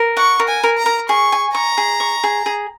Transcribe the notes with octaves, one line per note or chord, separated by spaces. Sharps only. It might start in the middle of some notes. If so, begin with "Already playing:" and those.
Already playing: A#4
F#5 C#6
A#4
G#5
A#4
A#5
A#4
G#4 C#6
G#5
A#5 C#6
G#4
C#6
G#4
G#4